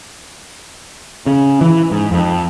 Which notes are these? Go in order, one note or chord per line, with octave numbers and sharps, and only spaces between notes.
C#3
E3
G#2
F2